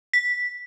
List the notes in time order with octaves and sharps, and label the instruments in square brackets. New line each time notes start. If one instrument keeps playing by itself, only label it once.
[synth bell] B6